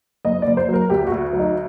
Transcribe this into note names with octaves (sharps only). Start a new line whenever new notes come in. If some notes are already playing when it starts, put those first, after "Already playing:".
F#1 D#5
F#1 D5
C5
F#3 A#4
D2 G4
F#4
D2
F#3
D#4